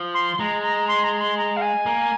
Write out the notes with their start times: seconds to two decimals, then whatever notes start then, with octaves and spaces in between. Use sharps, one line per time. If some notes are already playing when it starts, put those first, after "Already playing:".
Already playing: F3
0.14 C6
0.40 G#3 A#5
0.63 A#5
0.88 C6
1.04 A#5
1.20 C6
1.37 A#5
1.57 F5
1.62 G#5
1.86 A#3